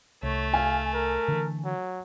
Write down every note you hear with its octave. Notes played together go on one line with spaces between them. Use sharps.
C2 A3 C#5
F5 G#5
A#4
D3 E3
F#3